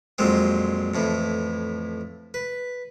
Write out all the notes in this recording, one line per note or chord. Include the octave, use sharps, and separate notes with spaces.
F2 A#2 F#3 G#3 C4
F2 A2 E3
B4